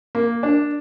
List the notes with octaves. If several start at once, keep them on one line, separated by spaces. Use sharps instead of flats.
A#3
D4